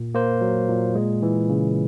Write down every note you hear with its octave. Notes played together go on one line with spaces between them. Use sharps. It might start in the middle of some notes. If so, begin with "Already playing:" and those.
Already playing: A#2
A#3 C5
F#3
A#2
G#3
E3
C#3